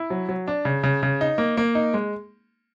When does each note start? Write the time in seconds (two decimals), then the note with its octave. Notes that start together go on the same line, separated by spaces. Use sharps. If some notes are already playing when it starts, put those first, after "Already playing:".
Already playing: E4
0.10 F#3
0.29 F#3
0.48 D4
0.65 C#3
0.83 C#3
1.03 C#3
1.21 D#4
1.38 A#3
1.57 A#3
1.75 D#4
1.94 G#3